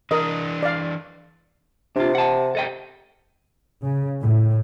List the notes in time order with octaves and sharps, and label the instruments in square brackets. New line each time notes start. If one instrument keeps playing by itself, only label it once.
[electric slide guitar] E3 D4 [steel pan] A#4 D#5
[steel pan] D5 F5
[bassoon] C3 [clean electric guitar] D4 F4
[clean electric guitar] F#5 A5
A4 D#5 G5
[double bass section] C#3
A2